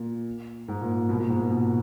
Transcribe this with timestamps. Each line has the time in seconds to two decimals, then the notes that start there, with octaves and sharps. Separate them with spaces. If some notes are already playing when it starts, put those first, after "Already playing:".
Already playing: A#2
0.68 G#2
0.81 A#2
0.95 A#2
1.09 B2
1.19 A#2
1.29 G#2
1.39 A#2
1.50 B2